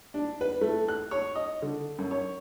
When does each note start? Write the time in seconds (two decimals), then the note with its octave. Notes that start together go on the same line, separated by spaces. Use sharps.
0.14 D4
0.41 B4
0.61 A3
0.88 F#6
1.11 C#5
1.35 D#5
1.62 D3
1.98 F#2
2.11 C#5